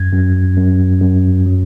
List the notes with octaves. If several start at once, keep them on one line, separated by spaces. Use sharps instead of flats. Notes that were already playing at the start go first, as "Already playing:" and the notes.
Already playing: F#2 G#6
F#2
F#2
F#2
F#3